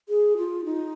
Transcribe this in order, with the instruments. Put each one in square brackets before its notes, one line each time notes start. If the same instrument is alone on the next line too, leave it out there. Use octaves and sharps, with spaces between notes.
[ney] G#4
F4
D#4